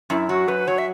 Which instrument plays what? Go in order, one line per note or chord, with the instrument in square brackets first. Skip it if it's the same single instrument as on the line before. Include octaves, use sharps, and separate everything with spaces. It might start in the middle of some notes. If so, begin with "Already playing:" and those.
[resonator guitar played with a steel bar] F#2 [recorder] E4
[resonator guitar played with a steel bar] F#3 [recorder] F#4
[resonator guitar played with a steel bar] F#2 [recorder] B4
[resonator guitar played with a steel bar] F#3 [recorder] C#5
[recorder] E5